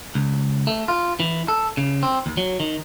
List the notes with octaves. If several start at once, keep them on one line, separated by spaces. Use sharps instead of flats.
C#2
A3
F4
E3
A4
C#3
C4
D#2
F#3
D#3